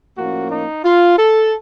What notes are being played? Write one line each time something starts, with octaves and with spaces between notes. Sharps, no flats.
A2 F3 A#3 C#4 F#4
D#4
F4
A4